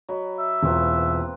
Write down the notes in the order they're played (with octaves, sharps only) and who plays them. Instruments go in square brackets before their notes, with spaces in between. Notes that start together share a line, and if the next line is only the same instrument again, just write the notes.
[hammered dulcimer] F#3 B5 [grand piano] D#5
[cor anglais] E5
[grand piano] E1 F4 [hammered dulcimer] A#3 C4 B4